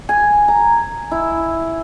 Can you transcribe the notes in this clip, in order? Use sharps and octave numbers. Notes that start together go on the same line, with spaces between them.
G#5
A#5
E4